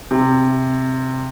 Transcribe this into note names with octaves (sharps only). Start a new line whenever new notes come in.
C3